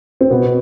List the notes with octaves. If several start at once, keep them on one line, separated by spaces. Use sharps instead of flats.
C4
B2 B3